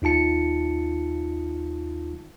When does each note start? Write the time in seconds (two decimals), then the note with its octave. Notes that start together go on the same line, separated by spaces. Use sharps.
0.02 D#2 D#4 F4 A5 C#7